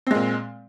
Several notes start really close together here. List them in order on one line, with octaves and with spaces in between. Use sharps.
C4 G#3 A#2